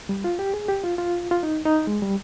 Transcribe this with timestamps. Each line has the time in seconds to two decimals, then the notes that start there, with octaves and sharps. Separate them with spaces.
0.09 G3
0.24 F4
0.39 G4
0.54 G#4
0.68 G4
0.84 F4
0.98 F4
1.31 F4
1.43 D#4
1.65 D#4
1.87 G#3
2.02 G3